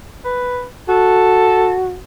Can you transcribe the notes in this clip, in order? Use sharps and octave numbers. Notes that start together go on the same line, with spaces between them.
B4
F#4 A4